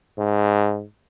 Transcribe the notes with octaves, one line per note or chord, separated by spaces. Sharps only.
G#2